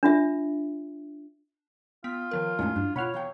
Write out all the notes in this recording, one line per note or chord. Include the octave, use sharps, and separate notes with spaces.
D4 F4 E5
B3 F4 B6
D#3 F3 A#4
F2 A2 G#3 A3 C#4 D#4 E4
G2 D4
B2 F4 C#5 F#5 B5 F6
E2 F5 G5